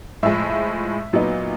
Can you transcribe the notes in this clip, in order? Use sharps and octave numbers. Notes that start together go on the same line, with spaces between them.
A2 F3 G#3 E5
A#2 F#3 B3 D#4